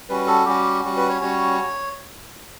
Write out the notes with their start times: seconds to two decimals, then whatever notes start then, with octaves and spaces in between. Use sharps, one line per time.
0.09 G3 C#4 F#4 B4
0.27 A4
0.46 G3 C#4 F#4 G4
0.85 G3 C#4 F#4
0.97 B4
1.09 C#5
1.21 G3 C#4 F#4 C#5